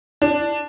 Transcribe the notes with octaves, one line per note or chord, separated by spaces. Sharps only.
D4